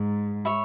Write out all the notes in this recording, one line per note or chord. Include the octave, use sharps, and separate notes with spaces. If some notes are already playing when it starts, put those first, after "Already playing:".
Already playing: G#2
C#5 E5 B5